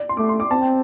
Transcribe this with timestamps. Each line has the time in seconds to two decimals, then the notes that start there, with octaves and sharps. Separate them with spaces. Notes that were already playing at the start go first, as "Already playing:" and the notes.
Already playing: D5
0.09 C6
0.17 A3 D6
0.29 C6
0.40 D6
0.50 C4 A5
0.61 G5